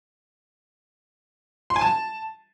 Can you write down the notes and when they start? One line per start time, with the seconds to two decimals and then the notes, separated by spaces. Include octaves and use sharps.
1.70 C6
1.76 G#5
1.81 A5